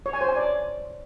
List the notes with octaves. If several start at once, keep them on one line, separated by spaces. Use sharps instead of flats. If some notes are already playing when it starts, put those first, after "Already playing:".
C#5
G#5
C5
G#5
D5